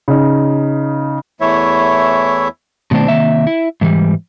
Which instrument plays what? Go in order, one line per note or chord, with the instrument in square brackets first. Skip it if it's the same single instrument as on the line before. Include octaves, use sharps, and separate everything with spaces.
[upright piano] C#3 D#4
[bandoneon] E2 E3 A3 E4 C#5 E5
[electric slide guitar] B2 D#3 A3 C4 D4
C3 D#3 A#3 E5
E4
G#2 E3 G3